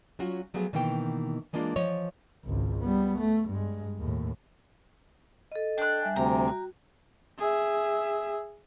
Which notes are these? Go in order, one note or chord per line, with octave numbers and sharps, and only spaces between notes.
F#3 C#4 F4 F#4
F3 F#3 A3 B3 G#4
B2 D#3 E3 A#3 G5
E3 G#3 A#3 D4 F4
E3 F3 C#5 D#5
G#1 C#2
G3 B3
A3
G2 G#3
D#2 A2
A4 D#5
D4 G5 F#6
G3 E5 G#5
D2 C3 G5 A#5
F#4
G#4 E5